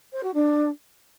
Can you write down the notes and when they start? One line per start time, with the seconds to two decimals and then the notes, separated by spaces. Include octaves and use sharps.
0.13 C5
0.23 F#4
0.34 D4